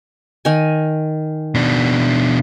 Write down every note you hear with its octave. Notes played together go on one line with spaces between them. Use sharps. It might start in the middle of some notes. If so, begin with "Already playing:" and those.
D#3 G#5
B2 D4